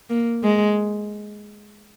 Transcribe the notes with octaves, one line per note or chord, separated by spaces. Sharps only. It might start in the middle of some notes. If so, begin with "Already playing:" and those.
A#3
G#3